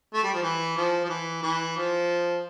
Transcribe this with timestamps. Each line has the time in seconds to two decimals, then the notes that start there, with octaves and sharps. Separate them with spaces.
0.14 A3
0.23 G3
0.33 F3
0.43 E3
0.77 F3
1.04 F3
1.09 E3
1.43 E3
1.77 F3